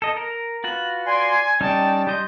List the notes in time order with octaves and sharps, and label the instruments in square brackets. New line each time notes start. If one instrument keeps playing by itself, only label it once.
[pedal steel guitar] A4 D#5
A#4
[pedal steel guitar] F4 F#4 B4 [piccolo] F#7
[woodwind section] D5 C6 [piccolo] G#5
[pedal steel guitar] G3 C#4 D#4 [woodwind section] D5 G5 [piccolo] A5
[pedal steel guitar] G3 D#5 C6 [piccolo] G6